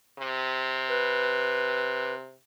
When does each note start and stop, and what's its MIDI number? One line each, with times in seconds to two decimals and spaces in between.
0.19 2.35 48
0.89 2.14 71